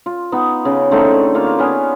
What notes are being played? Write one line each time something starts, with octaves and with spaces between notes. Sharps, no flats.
F4
B3 D#4
C#3
D3 A3 C4 D#4
A#3 F4 F5
B3 C#4 F5 G#5